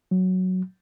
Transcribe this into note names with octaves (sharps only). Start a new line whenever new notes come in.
F#3